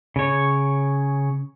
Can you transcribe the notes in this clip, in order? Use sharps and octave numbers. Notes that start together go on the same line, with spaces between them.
C#3 C#5